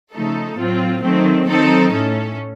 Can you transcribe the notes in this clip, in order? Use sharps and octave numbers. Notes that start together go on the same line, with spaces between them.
C#3 F3 A3 D#4 A4
A2 F#3 C4 F4
D#3 F#3 A3 C4
D#3 F#3 C4 D#4 A4
A2 A3 C#4 A4